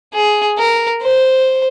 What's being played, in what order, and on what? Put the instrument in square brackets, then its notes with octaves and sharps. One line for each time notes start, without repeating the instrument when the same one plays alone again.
[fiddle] G#4
A#4
C5